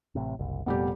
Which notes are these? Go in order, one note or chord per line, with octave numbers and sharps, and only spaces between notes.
A1 A2 C3
F#1 C2
F1 A#2 G3 B3 G4